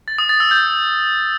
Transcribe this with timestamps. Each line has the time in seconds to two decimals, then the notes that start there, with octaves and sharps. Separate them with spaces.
0.08 A6
0.18 D#6
0.29 A6
0.40 E6
0.51 G6